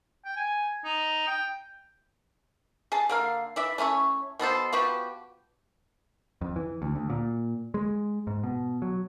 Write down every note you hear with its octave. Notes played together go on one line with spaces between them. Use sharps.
G5
G#5
D#4
G5
G#4 A5
D3 A#3 F5
E3 D5 E5
A3 C#4 E4 C#5
B2 B3 A4 C5
F3 B3 F#4 G4
F2
E3
D2
D2
A#2
G#3
G#2
B2
F#3